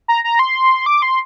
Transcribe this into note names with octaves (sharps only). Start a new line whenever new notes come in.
A#5
A#5
C6
D6
C6